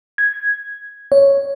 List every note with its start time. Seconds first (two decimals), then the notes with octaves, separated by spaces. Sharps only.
0.18 G#6
1.12 C#5